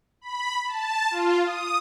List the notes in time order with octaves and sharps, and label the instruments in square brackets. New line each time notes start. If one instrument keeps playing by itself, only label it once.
[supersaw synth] B5
A5
F4
D#6